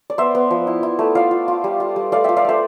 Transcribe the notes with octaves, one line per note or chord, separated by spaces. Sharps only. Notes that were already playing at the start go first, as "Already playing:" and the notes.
D5
B3 C5 E5
B3
F3
E4
E4
A3
F4 D5 F5
F4
F4
G3
F4
G3
A3 D5 F5
F4 E5 G5
D5 F5
A3 C5 E5